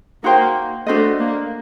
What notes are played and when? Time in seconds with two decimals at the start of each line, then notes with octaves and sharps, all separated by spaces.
0.24 A#3 D#4 F#4 C5 G5
0.87 A3 D4 F#4 C5 D#5
1.19 A#3